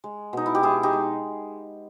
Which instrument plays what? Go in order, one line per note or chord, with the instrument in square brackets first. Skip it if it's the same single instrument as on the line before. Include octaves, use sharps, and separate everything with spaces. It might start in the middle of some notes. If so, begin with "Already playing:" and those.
[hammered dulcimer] G#3
B2 D#4
E4
G4
G#3 E4 G#4
D#4 G4
G#3